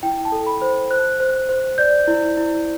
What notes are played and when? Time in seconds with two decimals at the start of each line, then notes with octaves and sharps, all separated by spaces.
0.03 E4 G5
0.25 A5
0.32 A4
0.47 B5
0.62 C5
0.90 C5 F#6
1.20 C5
1.49 C5
1.78 D5 G6
2.07 E4
2.37 E4